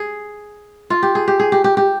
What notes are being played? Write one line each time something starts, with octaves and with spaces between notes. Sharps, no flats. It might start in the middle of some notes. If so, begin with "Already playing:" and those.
Already playing: G#4
F4
G4
G#4
G4
G#4
G4
G4
G4